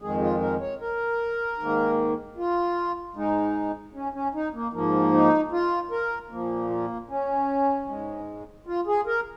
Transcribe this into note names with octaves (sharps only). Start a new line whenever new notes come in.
F2 D#3 G#3 G#4
F4
A#4
C#5
A#4
G#2 D#3 A#3
F4
G#2 G#3 D#4
C#4
C#4
D#4
A#3
G#2 F3 A#3
D#4
F4
A#4
A#2 F3 A#3
A#3
C#4
G#2 G#3
F4
G#4
A#4